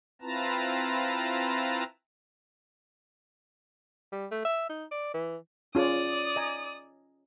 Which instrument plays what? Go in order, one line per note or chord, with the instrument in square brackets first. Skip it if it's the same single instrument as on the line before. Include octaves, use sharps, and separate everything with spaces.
[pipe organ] C4 E4 F4 B4 A5 A#5
[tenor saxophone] G3
A3
E5
D#4
D5
E3
[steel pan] C#4 F4 G#4 [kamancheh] D5 D#6
[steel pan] D#5 G#5 A#5